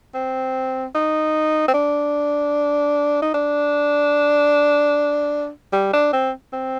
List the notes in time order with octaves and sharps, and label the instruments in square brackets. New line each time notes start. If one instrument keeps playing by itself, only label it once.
[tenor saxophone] C4
D#4
C4
D4
D#4
D4
G3
D4
C4
C4